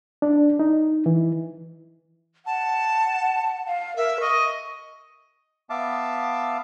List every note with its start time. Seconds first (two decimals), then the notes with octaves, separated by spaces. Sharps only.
0.22 D4
0.59 D#4
1.06 E3
2.46 F#5 A5
3.67 F5
3.96 A#4 E5
4.20 D#5 C#6
5.70 B3 E5 F5 A5 D6